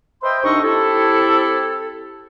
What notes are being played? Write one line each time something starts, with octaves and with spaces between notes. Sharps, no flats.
B4 C5 D#5 E5 G5 C6
C2 D4 D#4 A4 D#5 C#6
C4 E4 G4 A4